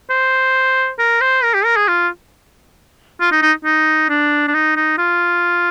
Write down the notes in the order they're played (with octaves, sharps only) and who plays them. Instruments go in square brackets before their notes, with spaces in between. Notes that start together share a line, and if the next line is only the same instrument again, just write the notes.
[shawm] C5
A#4
C5
A#4
G4
A#4
G#4
F4
F4
D#4
D#4
D#4
D4
D4
D#4
D#4
F4